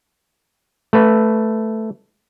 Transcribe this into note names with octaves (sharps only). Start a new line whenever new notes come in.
A3 B4